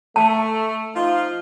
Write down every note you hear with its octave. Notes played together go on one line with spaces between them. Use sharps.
A3 A5
F3 D#4 F4